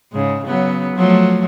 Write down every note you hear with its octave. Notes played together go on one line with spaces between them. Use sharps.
G#2 C#3
C#3 F#3 B3
F3 F#3 A3